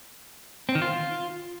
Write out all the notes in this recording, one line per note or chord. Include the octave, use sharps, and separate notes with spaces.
C4
D#3
F4